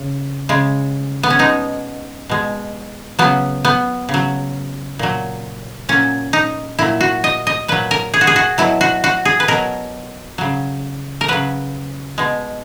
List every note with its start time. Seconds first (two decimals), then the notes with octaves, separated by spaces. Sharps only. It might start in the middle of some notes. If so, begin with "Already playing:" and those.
Already playing: C#3
0.49 C#3 G#3
1.23 B3
1.30 C#4
1.39 B2 G#3 D#4
2.29 B2 G#3
3.19 C#3 F#3 B3
3.65 B3
4.09 C#3
4.14 F#3
4.99 A#2 F#3
5.89 A#2 F#3 C#4
6.33 D#4
6.79 A#2 F#3 E4
7.01 F#4
7.24 D#5
7.47 D#5
7.68 A#2 F#3 B4
7.91 A#4
8.14 G#4
8.21 F#4
8.27 G#4
8.36 F#4
8.58 B2 F#3 E4
8.81 F#4
9.04 F#4
9.25 G#4
9.40 B4
9.48 B2 F#3 A#4
10.38 C#3 F#3
11.21 A#4
11.28 C#3 F#3 B4
12.18 B2 G#3